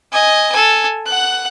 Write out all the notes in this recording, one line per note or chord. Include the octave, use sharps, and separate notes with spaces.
D#5 G#5
A4 G#5
F#5 F#6